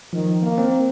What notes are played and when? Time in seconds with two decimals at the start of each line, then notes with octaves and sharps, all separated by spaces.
0.13 D#3 F3
0.42 A#3
0.58 C4